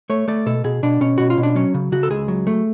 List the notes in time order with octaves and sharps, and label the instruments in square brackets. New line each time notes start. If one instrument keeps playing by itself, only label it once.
[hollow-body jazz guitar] A3 C#5
A3 D5
B2 A4
B2 G#4
B2 D4
B2 C#4
B2 F#4
F4
B2
D4
F#3 C#4
C#3
C#3 F#4
A4
C#2 G#4
F#3
A3